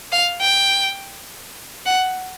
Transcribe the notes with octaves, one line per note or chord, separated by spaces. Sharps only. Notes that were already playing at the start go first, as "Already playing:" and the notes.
F5
G5
F#5